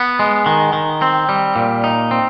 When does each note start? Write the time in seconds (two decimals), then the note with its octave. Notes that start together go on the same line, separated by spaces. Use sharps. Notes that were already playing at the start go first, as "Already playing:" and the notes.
Already playing: B3
0.19 G#3
0.46 D#3
0.73 D#3
1.02 C4
1.29 G3
1.56 A#2
1.84 D#4
2.11 C4